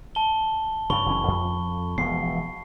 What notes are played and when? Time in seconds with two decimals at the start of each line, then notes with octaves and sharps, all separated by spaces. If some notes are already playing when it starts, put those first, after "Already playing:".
0.15 A5 G7
0.90 G2 C#3 B5 C#6 G7
1.06 F#1 E3 C#4
1.28 F2
1.98 E1 F3 B3 C7